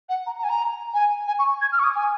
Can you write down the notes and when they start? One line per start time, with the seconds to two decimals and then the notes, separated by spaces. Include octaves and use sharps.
0.09 F#5
0.26 A#5
0.38 A#5
0.44 G#5
0.49 A#5
0.94 G#5
1.27 G#5
1.39 C#6
1.61 G#6
1.72 F6
1.79 C#6
1.84 D#6
1.95 G#5